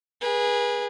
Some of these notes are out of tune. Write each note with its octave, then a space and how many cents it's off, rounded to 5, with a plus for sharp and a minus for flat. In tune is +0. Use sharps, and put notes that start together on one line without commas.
G#4 -10 B4 -30